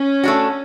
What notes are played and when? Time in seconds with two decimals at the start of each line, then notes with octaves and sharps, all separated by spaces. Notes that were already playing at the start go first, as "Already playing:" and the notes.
Already playing: C#4
0.23 A3 D4 F#4